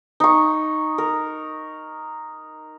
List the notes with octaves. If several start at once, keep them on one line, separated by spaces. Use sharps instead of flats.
D#4 C#6
A#4